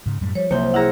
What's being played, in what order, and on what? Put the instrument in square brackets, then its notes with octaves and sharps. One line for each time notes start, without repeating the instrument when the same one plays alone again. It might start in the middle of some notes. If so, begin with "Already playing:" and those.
[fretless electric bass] G#2 C#3
F#2 A2 G3
[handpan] F3 [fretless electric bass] G3 [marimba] C#5
[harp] C2 G6 [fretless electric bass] F#3 [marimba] A#3 [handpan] C5
[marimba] E4 G#4 [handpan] F#5 [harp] A#5 E6 F6